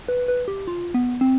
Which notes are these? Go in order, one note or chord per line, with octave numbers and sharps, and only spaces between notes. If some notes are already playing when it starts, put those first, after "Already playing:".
B4
B4
G4
F4
B3
C4